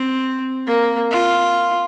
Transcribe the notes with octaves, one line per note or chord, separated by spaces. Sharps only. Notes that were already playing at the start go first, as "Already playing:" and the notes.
Already playing: C4
A#3
F4